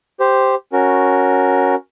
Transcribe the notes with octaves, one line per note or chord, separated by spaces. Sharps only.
G4 C5
C#4 F#4 A#4